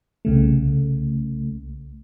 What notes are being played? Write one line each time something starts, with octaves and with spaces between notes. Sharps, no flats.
C2 C#3 A3